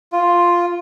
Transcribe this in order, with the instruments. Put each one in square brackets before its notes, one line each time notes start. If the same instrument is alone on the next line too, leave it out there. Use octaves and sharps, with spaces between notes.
[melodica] F4